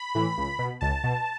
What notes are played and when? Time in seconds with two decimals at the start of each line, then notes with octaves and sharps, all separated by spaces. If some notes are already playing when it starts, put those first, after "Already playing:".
Already playing: B5
0.15 A2 E3
0.38 C#2
0.59 B2
0.81 C#2 A5
1.04 B2